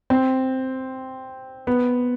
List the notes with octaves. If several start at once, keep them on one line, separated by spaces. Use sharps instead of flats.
C4
B3